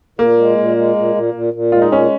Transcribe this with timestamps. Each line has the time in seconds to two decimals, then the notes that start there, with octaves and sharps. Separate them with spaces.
0.19 A#2 A#3
0.38 G#3
0.58 A#2
0.77 G#3
0.96 A#2
1.15 A#2
1.34 A#2
1.54 A#2
1.72 G#3 F4
1.82 D#4
1.92 A#2 C#4